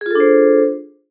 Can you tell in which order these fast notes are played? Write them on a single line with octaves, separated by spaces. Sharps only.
G#4 F4 A4 D4 C5